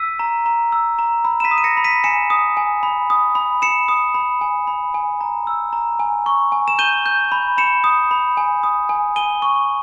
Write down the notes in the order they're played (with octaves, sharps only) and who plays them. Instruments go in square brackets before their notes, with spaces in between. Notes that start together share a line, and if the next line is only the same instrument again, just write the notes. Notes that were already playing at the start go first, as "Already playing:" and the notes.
Already playing: [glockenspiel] E6 B6 D#7
A#5
A#5
E6
A#5
B5
E7
B6 D#7
D#6
D#7
A#6 C#7
B5
B6 D#7
G#5 C#7 E7
D#6
G#5
B5
D#6
B5
B5 C#7 E7
D#6
B5
G#5
B5
G#5
A#5
E6
A#5
G#5
C#6
G#5
E7
G6 D#7 G7
G6
B5
B5 C#7 E7
D#6
B5
G#5
D#6
G#5
G#5 D#7 G7
C#6